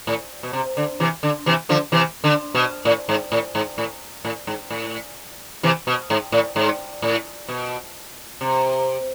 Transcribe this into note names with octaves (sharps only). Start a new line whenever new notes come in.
A2
B2
C3
D3
C3 E3
D3
C3 E3
D3 F3
C3 E3
D3
B2
A2
G#2
A2
G#2
A2
A2
G#2
A2
C3 E3
B2
G#2
A2
G#2
A2
B2
C3